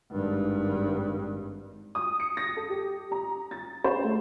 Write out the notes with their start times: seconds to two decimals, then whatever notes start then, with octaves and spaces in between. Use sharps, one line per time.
0.12 G#1 G2
1.95 D#6
2.20 C#7
2.37 A#6
2.57 A4
2.70 G4
3.12 A#5
3.51 A6
3.84 C5
4.04 A3